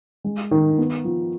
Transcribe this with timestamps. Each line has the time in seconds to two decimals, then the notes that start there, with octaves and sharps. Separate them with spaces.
0.24 G#3
0.51 D#3
0.78 B3
1.05 F3